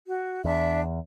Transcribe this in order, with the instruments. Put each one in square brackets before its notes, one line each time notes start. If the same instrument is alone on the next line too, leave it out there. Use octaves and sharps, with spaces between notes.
[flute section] F#4
[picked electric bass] E2 [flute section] D4 E5